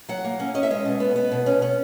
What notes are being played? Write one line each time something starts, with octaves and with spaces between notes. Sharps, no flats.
F#3 F#5
A#3
C#4
C#4 D#5
E5
G#3 D#5
B2
B3
B3
B2
C#4
C#4